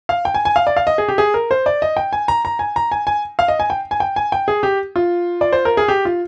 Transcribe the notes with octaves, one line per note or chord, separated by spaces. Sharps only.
F5
G5
G#5
G#5
F5
D5
F5
D#5
G#4
G4
G#4
A#4
C5
D5
D#5
G5
G#5
A#5
A#5
G#5
A#5
G#5
G#5
F5
D#5
G#5
G5
G#5
G5
G#5
G5
G#4
G4
F4
D5
C5
A#4
G#4
G4
F4